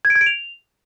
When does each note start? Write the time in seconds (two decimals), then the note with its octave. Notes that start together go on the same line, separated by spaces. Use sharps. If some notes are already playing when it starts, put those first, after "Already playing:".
0.05 G#6
0.10 D7
0.16 G#6
0.21 D7
0.26 F7